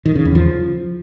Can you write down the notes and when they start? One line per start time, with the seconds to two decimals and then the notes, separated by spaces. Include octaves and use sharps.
0.06 D#3
0.15 C#3
0.25 E2
0.35 F3